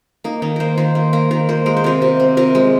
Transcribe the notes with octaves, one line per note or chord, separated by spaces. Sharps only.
A#3 D#4
D#3 D#4
A#3 A#4 C5
D#3 C5
A#3
A#3 A#4
D#3 A#4
A#3 C5
G#3 A#4
C5
C3 A#4
C3
C4
C3 A#4
G#3